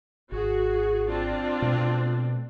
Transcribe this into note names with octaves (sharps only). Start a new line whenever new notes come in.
G#1 F#4 G#4
C4 D4 F4
B2 G#3 A3